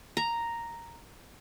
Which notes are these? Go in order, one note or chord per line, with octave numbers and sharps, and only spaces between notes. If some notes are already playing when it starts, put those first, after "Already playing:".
A#5